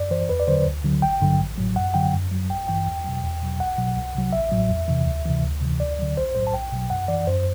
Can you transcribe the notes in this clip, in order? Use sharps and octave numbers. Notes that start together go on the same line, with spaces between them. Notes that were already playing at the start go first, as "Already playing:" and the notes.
Already playing: F#2 D5
E3 C5
E2 B4
D5
D3 F#3 C5
D2
D3 F#3
A1 G5
G2 D3 F#3
A1
A2 F#3
F#2 F#5
D3 F#3 G5
F#2
F#3
A1 G5
G2 E3 G5
E2
B2 F#3
E2
B2 F#3
B1 F#5
B2 F#3
C2
C3 F#3
A1 E5
A2 F#3
E2
C3 E3
D2
C3 E3
D2
C3 E3
D2 D5
D3 F#3
B1 C5
A2 F#3 C5
A5
B1 G5
B2 F#3
F#2 F#5
E3 D5
F#2 C5